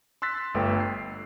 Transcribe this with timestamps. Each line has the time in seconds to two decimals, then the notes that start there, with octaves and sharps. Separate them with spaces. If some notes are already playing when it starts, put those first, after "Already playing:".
0.22 C6 E6 F#6 A6 B6
0.55 G1 A3 F4 B4 G5
0.80 C7